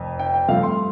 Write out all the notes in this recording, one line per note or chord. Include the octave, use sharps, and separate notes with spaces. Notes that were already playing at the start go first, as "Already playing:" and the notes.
Already playing: F1 F2
G5
G5
G2 F3 A3 F5
C6